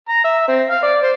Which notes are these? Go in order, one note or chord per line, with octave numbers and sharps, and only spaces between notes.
A#5
E5
C4
F5
D5
C5